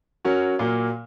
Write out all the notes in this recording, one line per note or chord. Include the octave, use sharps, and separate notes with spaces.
F#3 C#4 F#4 A#4
A#2 F#3 A#3